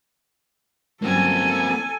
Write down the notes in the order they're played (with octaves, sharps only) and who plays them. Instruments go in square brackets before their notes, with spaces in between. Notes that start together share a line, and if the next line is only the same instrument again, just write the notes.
[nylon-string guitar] G2 F#3 C#4 [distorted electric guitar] A#3 C4 [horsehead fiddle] A4 G#5